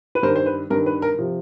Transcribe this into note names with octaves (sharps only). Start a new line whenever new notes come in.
B4
G2 D#3 A#4 C5
C5
B4
G2 D#3 A#4
B4
A#4
C3 F3